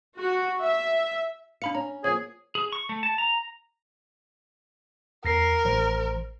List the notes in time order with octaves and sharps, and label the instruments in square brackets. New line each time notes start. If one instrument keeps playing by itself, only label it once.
[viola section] F#4
E5
[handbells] D4 B5 C#7 [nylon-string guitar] F5
[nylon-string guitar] C#4 [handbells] A#5
[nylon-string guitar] F3 A#3 [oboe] G#4 [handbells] C#5
[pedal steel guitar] G#4
C#6
A3
A5
A#5
[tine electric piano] E2 A#6 C7 [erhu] A#4
[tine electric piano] A1 C5